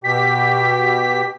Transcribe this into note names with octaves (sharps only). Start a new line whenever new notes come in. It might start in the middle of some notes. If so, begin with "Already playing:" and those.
B2 G4 B6